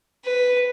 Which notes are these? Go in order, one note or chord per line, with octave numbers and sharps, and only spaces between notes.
B4